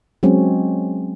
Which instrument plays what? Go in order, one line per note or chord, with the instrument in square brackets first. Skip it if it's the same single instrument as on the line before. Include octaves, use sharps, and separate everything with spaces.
[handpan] F#3 G#3 C4 C#4